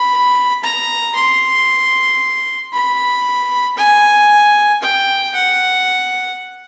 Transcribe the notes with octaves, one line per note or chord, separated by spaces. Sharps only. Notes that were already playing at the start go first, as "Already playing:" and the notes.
Already playing: B5
A#5
C6
B5
G#5
G5
F#5